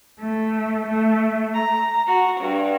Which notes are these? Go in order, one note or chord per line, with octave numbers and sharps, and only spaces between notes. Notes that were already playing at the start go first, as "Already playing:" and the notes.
A3
A3
A#5
F#4
G2